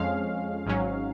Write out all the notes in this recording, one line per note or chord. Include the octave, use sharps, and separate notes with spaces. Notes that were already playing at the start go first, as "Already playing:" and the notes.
Already playing: F2 F3 G#3 C#4 F5
G#1 G#2 F#3 C#4